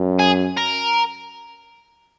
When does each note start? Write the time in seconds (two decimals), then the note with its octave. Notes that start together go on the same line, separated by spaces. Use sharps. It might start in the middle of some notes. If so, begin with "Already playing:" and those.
Already playing: F#2
0.19 G#4
0.57 A#4